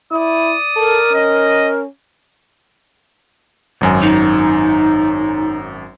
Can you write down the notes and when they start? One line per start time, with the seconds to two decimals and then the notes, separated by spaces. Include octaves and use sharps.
0.12 E4 D5 D#6
0.76 A4 A#4
1.11 C#4 D#5
3.81 G#1 F#2 G#5
4.02 D#4